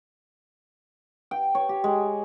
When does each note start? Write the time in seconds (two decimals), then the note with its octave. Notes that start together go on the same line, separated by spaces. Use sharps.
1.31 G5
1.55 C#5
1.69 G4
1.84 G#3